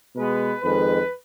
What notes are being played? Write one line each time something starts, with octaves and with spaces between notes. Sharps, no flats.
B2 G#3 B3 B4
F2 D#3 G#3 B4